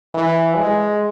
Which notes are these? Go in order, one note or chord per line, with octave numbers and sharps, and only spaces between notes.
E3
G#3